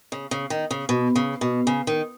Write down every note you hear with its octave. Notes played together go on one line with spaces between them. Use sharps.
C#3
C#3
D#3
C#3
B2
C#3
B2
C#3
D#3